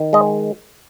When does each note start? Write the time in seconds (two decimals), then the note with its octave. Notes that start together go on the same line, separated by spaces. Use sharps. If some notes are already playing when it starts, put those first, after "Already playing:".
Already playing: D#3
0.13 G#3 D#5